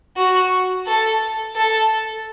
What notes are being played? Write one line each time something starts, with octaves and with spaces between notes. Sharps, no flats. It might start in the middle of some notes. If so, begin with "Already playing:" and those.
F#4
A4
A4